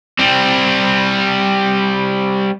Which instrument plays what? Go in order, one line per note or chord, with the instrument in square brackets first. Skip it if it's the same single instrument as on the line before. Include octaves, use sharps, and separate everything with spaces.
[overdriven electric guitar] G3 C4